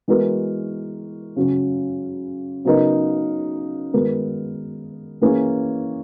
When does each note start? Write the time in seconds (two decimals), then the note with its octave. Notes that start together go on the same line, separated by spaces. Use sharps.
0.08 E3 G#3 B3 F#4 A#4
1.36 C#3 F#3 C#4
2.65 C#3 F#3 B3 D#4 A#4
3.93 D#3 G#3 B3 F#4 A#4
5.22 E3 A#3 C#4 G#4